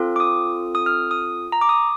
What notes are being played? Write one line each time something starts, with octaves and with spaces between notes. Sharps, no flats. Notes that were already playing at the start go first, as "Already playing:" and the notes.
Already playing: C4 F4 A4
D6
D#6
D#6
F6
D#6
A#5
D6
D#6